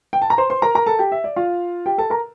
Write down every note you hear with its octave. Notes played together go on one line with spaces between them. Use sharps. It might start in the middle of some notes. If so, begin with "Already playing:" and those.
G5
A5
A#5
C5 C6
C5 C6
A#4 A#5
A#4 A#5
A4 A5
G4 G5
E5
D5
F4 F5
G4 G5
A4 A5
A#4 A#5